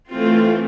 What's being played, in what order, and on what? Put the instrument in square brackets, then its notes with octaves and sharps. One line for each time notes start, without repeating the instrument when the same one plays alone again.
[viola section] E3 A3 C4 F4